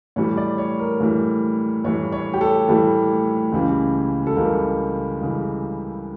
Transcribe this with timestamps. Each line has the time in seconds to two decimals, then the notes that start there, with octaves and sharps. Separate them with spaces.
0.16 A2 E3 G3 C#5
0.37 D5
0.58 C#5
0.79 A#4
1.00 A2 E3 G3
1.84 A2 E3 G3 C#5
2.12 C#5
2.34 G4
2.41 A4
2.68 A2 E3 G3 A4
3.52 C#2 C#3 E3 G3
4.27 A4
4.36 C#2 C#3 E3 G3 A#4
5.21 C#2 C#3 E3 G3